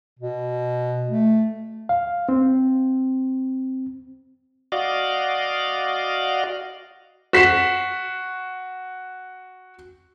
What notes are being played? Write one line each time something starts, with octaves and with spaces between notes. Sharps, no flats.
B2
A3
F5
C4
F#4 D5 D#5 F5
F#4 B6 C7 E7